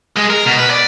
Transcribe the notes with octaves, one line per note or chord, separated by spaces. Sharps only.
G#3
A#4
B2
B4
D5